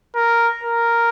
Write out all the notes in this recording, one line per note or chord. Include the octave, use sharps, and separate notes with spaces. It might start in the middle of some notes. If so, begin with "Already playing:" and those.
A#4
A#4